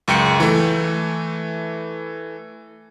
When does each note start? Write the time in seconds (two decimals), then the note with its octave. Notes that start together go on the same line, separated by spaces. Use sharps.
0.08 C#2 F#2 G5 G6 C#7
0.40 E3 A3